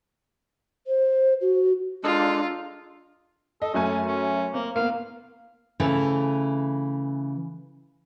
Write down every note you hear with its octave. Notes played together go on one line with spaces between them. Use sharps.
C5
F#4
G#3 D4 D#4 F4 A4
A4 D#5
F#2 A3 C#4 G#5
C#4
A#3 C4
A#3 B3 F5
C#3 E3 A3 C4 A4